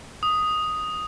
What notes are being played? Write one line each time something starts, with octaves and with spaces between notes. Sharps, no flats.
D#6